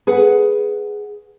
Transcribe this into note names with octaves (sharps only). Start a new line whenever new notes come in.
G#4 B4 F#5